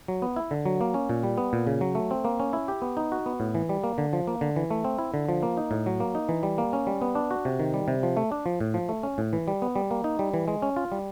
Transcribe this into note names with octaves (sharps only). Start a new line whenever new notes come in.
F#3
B3
E4
D3
F#3
A#3
C#4
A#2
G3
B3
A#2
C#3
F#3
A3
C4
A#3
C#4
E4
G4
B3
D#4
F#4
B3
A2
E3
G3
A#3
D3
F3
A#3
D3
E3
A3
C4
E4
D3
F3
A#3
D#4
A2
F#3
A#3
D#4
E3
G3
A#3
C#4
G3
B3
D4
F#4
C3
D#3
G3
C3
F3
A3
D4
F3
A2
F3
A3
C#4
A2
E3
G3
B3
G3
A#3
D#4
G3
E3
G#3
C#4
F4
G3